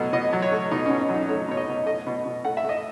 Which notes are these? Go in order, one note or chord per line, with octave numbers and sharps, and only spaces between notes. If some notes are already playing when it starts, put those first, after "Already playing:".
Already playing: B2 F#3 A3
B2 D#5
F#3
C#5
A3
B2 D#4
B2 C#4
C#4
F#3
D#4
A3 C#5
B2 C#5
D#5
B2
A3 D#5
B2
B2
A3 F#5
E5
A3 D#5